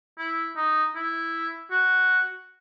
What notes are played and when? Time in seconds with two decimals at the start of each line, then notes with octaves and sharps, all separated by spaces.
0.18 E4
0.56 D#4
0.95 E4
1.71 F#4